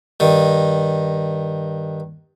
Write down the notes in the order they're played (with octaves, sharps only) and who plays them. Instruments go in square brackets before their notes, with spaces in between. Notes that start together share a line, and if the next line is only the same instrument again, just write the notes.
[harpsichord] G2 D#3